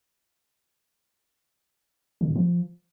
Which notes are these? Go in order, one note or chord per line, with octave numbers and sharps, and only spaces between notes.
D3
A2
F3